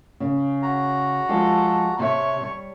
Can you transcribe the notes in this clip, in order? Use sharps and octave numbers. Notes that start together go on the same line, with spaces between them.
C#3
F#4 A#5
F3 G#3 G4 A4
C3 C#5 E5
G3